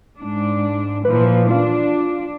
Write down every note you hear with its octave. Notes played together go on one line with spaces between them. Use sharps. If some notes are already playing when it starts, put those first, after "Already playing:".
G#2 D4
A#2 E3 F3 B4
D4 F4